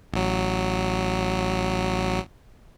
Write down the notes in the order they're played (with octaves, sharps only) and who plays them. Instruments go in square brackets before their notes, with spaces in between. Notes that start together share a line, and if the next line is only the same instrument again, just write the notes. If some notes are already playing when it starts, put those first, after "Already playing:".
[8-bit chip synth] A1 F#3